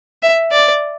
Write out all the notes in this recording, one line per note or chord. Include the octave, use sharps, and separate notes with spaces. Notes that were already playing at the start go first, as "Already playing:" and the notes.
E5
D5